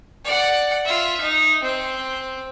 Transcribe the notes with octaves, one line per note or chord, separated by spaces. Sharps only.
D5 F#5
F4 E5
D#4
C4